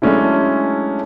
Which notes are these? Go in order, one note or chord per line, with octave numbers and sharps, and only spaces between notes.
F#3 G#3 A3 C#4 D4 E4